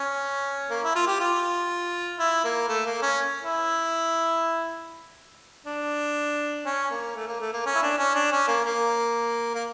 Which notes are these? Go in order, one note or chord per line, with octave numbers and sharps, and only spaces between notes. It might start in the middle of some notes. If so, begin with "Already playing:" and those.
Already playing: C#4
A#3
E4
F4
G4
F4
E4
A#3
A3
A#3
C#4
E4
D4
C#4
A#3
A3
A#3
A3
A#3
C#4
E4
D4
C#4
D4
C#4
A#3
A#3
A#3